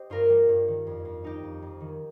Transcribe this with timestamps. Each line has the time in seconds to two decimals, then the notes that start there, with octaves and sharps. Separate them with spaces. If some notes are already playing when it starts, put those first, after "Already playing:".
Already playing: G4 C5 D#5
0.10 G2 F4 A#4
0.30 G3
0.49 G2
0.68 D#3
0.87 F2
1.05 F2
1.23 G3 D#4 G4
1.43 F2
1.62 F2
1.80 D#3